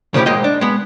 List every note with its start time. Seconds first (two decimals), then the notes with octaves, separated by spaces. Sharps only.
0.14 C#3 F3 A3 D4 E4 G4
0.26 B1 G#2 G#3 A#3 D#5 G5
0.44 D4
0.61 G#3 B3